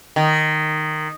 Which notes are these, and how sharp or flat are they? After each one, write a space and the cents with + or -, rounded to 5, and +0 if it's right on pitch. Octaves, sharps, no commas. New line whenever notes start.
D#3 -10